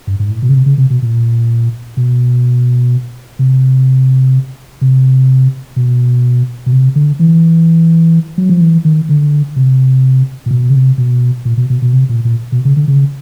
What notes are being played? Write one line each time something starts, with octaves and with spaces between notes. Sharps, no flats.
G2
G#2
A2
B2
C#3
C3
C#3
C3
B2
A#2
B2
C3
C3
B2
B2
C3
D3
E3
F#3
F3
E3
D#3
D3
C3
A#2
B2
C#3
C3
B2
A#2
B2
B2
B2
C3
A#2
A#2
B2
C#3
D3
C#3